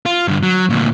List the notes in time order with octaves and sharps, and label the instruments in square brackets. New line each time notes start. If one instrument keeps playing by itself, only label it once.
[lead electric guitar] F4
G2 D3
F#3
D2 A#2